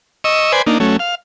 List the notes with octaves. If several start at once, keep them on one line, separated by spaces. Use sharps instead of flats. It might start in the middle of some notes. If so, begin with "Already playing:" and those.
D#5 C#6 E6
B4 C5 D5 G#5
A#3 D4 D#4
F#3 A3 C#4
F5